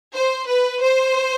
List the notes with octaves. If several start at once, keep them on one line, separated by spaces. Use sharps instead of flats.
C5
B4
C5